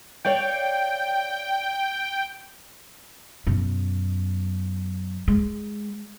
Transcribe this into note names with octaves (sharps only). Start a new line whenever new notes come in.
C#5 D5 F5 G5
F#2 B2
G#3